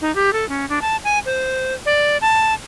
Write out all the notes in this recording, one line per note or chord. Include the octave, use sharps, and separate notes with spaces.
D#4
G4
A4
C#4
D4
A5
G#5
C5
D5
A5